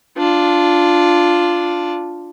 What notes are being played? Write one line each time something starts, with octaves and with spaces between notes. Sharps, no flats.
D4 F4